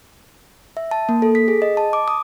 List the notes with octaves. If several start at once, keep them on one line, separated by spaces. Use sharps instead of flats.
E5
A5
A#3
A4
B6
G#4
D#5
A5
D6
D#6